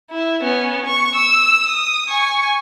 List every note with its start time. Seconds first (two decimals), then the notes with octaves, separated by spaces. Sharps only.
0.10 E4
0.41 B3 C#4
0.86 C#6
1.15 E6
1.69 D#6
2.09 G#5 C#6